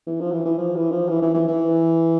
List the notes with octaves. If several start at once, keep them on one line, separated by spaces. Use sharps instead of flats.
E3
F3
E3
E3
F3
E3
F3
E3
E3
E3
E3